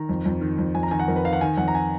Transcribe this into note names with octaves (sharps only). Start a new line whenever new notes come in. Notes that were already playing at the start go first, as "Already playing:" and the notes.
Already playing: D#3 A#5
F2
F2
D#3
F2
F2 G#5
A#5
D#3 G#5
F#5
F2 A#4
B4
D#3 F5
F#5
D#3 G#5
F2 F#5
A#5
G#5